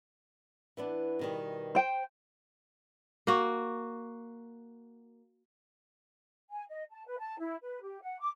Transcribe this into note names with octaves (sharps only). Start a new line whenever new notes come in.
E3 B3 D4
B2 D#3 G3
C5 G5
A#3 F#4
G#5
D#5
A5
B4
A5
E4
B4
G4
F#5
D6